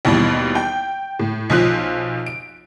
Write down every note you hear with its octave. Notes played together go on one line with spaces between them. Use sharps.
D#2 B2 E3 G3
G5
A2
B1 F3 F4 F#6
D7